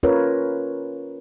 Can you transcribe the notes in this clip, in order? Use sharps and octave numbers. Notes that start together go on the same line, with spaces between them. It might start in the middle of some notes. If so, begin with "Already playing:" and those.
C#4 F4 A#4 B4 C#5